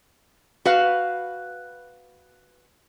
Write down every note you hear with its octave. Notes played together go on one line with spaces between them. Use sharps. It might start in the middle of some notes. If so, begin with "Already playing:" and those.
F#4 B4 F5